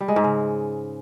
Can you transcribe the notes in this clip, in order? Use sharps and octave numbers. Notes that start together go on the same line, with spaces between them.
G3
G#3
G#2
C#3